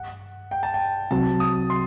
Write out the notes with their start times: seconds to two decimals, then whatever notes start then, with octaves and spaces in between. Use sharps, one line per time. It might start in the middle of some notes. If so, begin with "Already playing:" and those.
Already playing: G2 F#5
0.51 G5
0.63 A5
0.74 G5
1.11 C2 C3 F#3 C4 F#4 A5
1.40 D#6
1.70 C6